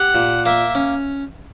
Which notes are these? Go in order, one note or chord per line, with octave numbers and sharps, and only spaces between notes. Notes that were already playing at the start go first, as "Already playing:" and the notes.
Already playing: G4 F#5
A#2
A#3 E5
C#4